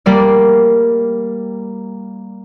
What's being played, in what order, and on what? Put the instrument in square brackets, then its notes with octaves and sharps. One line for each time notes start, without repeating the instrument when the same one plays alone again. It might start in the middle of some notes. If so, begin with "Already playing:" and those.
[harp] G3 A#3 D5